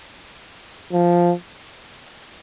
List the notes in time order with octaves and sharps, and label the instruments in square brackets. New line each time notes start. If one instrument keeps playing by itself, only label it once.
[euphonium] F3